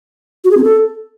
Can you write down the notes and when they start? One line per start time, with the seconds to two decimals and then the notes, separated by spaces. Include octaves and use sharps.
0.44 F#4
0.51 G#4
0.57 C4
0.64 A4